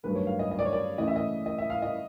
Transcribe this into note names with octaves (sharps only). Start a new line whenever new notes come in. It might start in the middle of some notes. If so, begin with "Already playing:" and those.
G2 D#3 F#3 A3 B4
C#5
F5
D#5
D#5
D5
C#5
D5
C#3 E3 A3 D#5
E5
D#5
D#5
E5
F5
D#5